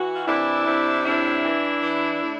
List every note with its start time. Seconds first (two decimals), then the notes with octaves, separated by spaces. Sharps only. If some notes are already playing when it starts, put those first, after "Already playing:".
Already playing: E3 F#4
0.16 F4
0.28 C3 D4 E4
0.67 C3
1.05 A2 D4 E4
1.44 E3
1.83 E3
2.22 A2